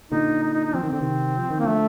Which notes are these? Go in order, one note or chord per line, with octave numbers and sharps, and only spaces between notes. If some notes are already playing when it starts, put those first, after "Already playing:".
A#2 D3 D#4
D#4
D#4
D#4
F3 C4
D#3
D3 C4
C3 D#3
F3
D#3
A#3
D3 F3 A3